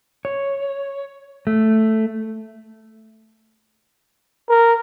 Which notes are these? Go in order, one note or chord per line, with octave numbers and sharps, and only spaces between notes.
C#5
A3
A#4